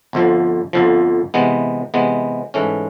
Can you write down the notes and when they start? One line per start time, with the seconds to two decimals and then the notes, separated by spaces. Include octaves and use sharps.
0.13 G1 F2 D3 F3
0.73 G1 F2 D3 F3
1.34 C3 E3 G#3 B3
1.94 C3 E3 G#3 B3
2.54 G#2 E3 A3 C#4